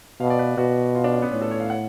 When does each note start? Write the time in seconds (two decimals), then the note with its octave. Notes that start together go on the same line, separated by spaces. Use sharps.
0.20 B2 F5
0.30 D5
0.39 B4
0.58 B2 F#4
0.95 F4
1.04 D4
1.13 C#4
1.22 B3
1.32 A2 C#4
1.41 A4
1.51 C#5
1.60 F5
1.70 F#5